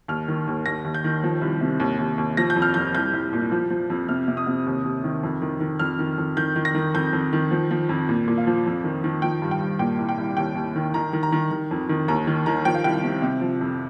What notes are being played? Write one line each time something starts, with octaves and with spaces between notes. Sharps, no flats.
D#2 F6
D#3
D#2
D#2 A#6
D#2
G6
D#3
F3
C2
C3
D#2
D#2
D#2
F3 A#6
G6
F2
F6
F2 G6
C2 G6
C2
A#2
F3
F3
F2
C3 F6
C3
D#6
C3
D#2
D#2
D#3
F2
D#3
D#3
F2 F6
D#3
F2
D#3 G6
D#3
A#6
D#3
F2 G6
F2
D#3
F3
F3
F2
A#2
A#2
F5
F3
F2
D#3
D#3
F3 G5
G2
G5
G2
A#2 G5
C2
G5
C2
D#2 G5
D#2
D#3
D#3 A#5
D#3
A#5
D#3
D#3
F2
D#3
D#2 A#5
D#3
D#3 A#5
F3 G5
F5
C2 G5
C3
C3
F3
F2